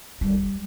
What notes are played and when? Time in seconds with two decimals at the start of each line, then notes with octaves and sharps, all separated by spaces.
0.21 G3